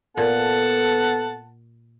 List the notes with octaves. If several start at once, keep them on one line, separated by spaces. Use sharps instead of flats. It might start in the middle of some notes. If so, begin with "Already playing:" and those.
A#2 B3 A4 F#5 A5